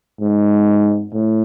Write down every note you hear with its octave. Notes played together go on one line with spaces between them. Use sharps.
G#2
A2